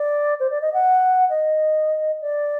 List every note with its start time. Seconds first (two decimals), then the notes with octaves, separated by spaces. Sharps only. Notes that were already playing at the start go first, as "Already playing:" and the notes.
Already playing: D5
0.40 C5
0.51 D5
0.62 D#5
0.74 F#5
1.30 D#5
2.22 D5